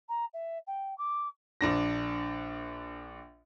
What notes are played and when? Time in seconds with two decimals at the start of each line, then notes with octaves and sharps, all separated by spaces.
0.09 A#5
0.34 E5
0.67 G5
0.98 D6
1.61 A#1 D4 A#6